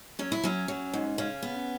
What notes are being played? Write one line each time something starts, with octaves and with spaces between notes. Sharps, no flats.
F#3 C#4
E4
F#3 C#4
F#3
G#2
C#3 C#4
B3